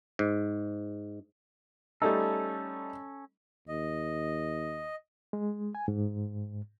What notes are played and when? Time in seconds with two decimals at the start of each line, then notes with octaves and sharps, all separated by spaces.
0.19 G#2
2.02 G3 A3 C#4 D#4 A4
3.68 D#2 D#5
5.33 G#3
5.75 G#5
5.88 G#2